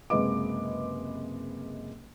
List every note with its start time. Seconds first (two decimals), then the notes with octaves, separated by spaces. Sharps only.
0.10 F#1 C3 G#3 B4 D#5 D6